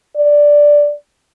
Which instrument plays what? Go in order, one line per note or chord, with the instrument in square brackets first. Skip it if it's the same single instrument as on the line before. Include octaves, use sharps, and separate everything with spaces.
[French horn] D5